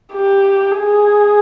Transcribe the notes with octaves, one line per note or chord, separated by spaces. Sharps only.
G4
G#4